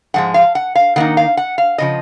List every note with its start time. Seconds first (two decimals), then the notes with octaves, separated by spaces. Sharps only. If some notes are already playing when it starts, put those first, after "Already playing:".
0.14 G#2 F3 G#3 F#5
0.34 F5
0.55 F#5
0.75 F5
0.96 D#3 A#3 D#4 F#5
1.17 F5
1.37 F#5
1.58 F5
1.78 C#3 F3 D#5